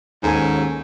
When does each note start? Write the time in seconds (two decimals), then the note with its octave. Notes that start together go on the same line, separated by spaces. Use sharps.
0.23 D#2 G#2 C#4 D#4 A4 G#5